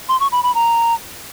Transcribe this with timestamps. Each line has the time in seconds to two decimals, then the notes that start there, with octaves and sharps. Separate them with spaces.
0.09 C6
0.20 C#6
0.32 B5
0.43 B5
0.55 A#5